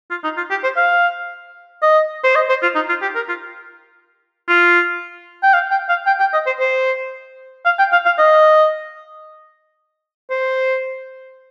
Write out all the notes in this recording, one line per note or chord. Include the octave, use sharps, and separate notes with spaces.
F4
D#4
F4
G4
C5
F5
D#5
C5
D#5
C5
F4
D#4
F4
G4
A#4
F4
F4
G5
F5
G5
F5
G5
G5
D#5
C5
C5
F5
G5
F5
F5
D#5
C5